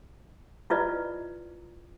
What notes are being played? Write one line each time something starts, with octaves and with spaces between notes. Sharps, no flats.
E4 F4 B4 D5 D#5